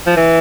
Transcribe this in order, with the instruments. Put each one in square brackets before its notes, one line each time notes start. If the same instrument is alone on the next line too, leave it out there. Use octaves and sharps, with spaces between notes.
[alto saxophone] F3
E3